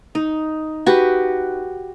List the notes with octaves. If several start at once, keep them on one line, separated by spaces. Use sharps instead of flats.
D#4
F#4 G4 B4